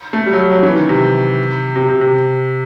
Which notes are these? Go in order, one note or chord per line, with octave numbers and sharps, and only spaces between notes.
A3
G3
F#3
G3
F#3
E3
D#3
C3
C3
C3
C3